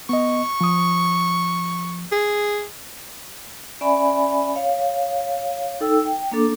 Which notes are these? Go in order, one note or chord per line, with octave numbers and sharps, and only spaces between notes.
B3 D#5 C#6
F3 D#6
G#4
C#4 D5 E5 G#5 B5
C#5 F5
D#4 A4 G5 E6
G5
A#3 D4 A4 D6